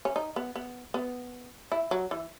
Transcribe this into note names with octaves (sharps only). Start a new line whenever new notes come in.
C#4
D#4
B3
B3
B3
E4
F#3
E3